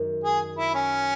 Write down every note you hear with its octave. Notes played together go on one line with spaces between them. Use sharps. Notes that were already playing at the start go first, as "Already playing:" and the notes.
Already playing: F#2 D#3 G#3
G#4
E4
C#4